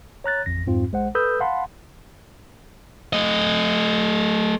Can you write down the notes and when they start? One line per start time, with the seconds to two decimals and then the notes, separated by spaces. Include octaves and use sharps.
0.24 C#5 A#5 F#6 A6
0.46 A1 F2 A#6
0.66 F2 G#2 C4 F4
0.92 A#1 G#3 C5 F#5
1.15 A4 B4 B5 D#6 E6 G6
1.40 F5 F#5 A5 B5 C6
3.13 A3 D#5